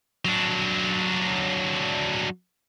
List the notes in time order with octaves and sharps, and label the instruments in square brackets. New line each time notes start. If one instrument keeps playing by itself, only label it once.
[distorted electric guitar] F#3 D4